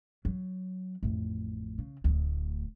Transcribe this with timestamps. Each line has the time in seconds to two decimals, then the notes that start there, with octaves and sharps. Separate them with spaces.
0.25 F#3
1.03 A1 F2
1.78 C#3
2.04 D1 D2